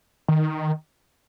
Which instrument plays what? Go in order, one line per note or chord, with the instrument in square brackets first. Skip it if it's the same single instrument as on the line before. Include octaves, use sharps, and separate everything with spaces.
[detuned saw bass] D#3